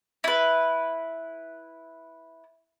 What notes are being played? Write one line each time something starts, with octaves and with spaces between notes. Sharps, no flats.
E4 B4